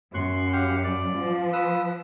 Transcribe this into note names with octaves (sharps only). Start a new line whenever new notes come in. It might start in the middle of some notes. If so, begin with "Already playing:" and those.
F#2 C6 C#6 F#6
G4 F5 F#5
D5
F3
B4 D#6 E6